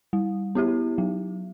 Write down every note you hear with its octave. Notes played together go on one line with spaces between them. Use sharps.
G3
B3 E4 G4
F#3